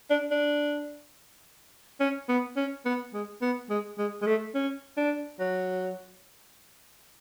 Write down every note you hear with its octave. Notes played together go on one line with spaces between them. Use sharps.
D4
D4
C#4
B3
C#4
B3
G#3
B3
G#3
G#3
G#3
A3
C#4
D4
F#3